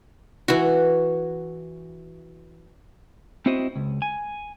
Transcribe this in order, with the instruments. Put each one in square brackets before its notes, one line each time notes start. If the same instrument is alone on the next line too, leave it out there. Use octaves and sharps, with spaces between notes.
[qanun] E3 F#4
[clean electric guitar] C4 E4 F#4 C5 D#5
C#2
G#5